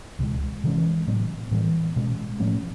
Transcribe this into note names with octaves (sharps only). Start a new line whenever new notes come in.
C#2 B2 G#3
C3 E3 G#3 C#4
A2 F#3 B3
A2 E3 G3 B3
B2 G#3 C#4
A2 F3 A3 C#4